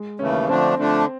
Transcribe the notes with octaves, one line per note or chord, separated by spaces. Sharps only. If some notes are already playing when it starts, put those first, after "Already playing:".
Already playing: G#3
D#2 C#3 E3 A3 C#4
D3 F3 A3 C4 D4
D3 F3 A3 D4